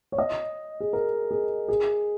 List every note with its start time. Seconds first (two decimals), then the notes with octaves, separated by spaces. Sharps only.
0.12 C#5
0.18 D#5
0.80 G#4
0.93 A#4
1.31 G#4
1.68 G#4